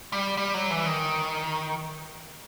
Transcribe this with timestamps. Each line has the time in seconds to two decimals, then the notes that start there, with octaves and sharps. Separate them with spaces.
0.12 G3
0.37 G3
0.54 F#3
0.70 E3
0.86 D#3